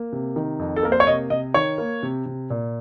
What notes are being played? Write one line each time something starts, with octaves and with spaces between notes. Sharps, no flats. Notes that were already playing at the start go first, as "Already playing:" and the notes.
Already playing: A#3
C3
D#3
F2
A4
A#3 A#4
C5
C#5
C3 D#5
C3 D#5
D#3 C#5
A#3
C3
C3
A#2